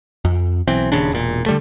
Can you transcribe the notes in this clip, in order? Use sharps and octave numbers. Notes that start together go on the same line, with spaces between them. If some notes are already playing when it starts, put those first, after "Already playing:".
F2
B1 E3 C4
D#1 D#2 C#3 D4
E1 A#2
D3 G3 A3